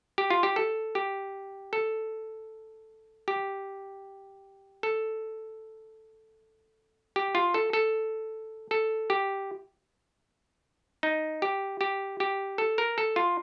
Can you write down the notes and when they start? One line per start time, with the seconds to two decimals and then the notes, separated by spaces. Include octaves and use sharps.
0.18 G4
0.30 F4
0.43 G4
0.56 A4
0.95 G4
1.73 A4
3.28 G4
4.83 A4
7.16 G4
7.35 F4
7.54 A4
7.73 A4
8.71 A4
9.10 G4
11.03 D#4
11.42 G4
11.81 G4
12.20 G4
12.58 A4
12.78 A#4
12.98 A4
13.16 F4